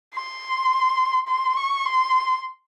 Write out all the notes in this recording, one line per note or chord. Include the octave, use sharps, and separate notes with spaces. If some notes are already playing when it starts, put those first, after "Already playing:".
C6
C6
C#6
C6